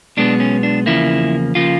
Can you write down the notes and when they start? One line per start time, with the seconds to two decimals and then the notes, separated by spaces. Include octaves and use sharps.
0.17 B1 B2 G#3 B3 D4
0.40 C#4
0.63 D4
0.86 E2 C#3 F3 A#3 E4
1.55 C#3 F3 A#3 F4